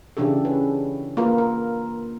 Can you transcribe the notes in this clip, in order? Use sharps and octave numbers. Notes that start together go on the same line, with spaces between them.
C#3 E3 D4 G4 A4
C#4 B4
A#3 F4 A#4 B4
A#4